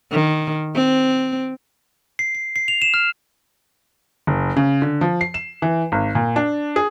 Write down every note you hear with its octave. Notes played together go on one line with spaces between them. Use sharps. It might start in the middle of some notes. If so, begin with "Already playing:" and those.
D#3
C4
C7
C7
C7
F7
E7
F6
F#1
C#3
D3
F3
C7
E7
E3
G#1
A#2
D4
G#4